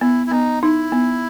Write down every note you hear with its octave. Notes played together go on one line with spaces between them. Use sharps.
B3 E4
E4
B3 D#4
D#4 E4
B3